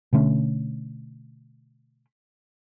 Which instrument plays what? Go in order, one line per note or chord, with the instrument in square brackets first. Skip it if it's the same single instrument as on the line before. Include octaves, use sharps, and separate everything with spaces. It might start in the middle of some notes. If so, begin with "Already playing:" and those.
[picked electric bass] B2 D3 A3 C#4